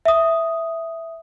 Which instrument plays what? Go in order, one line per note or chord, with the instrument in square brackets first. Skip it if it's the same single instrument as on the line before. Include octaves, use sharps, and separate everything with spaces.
[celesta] E5 D#6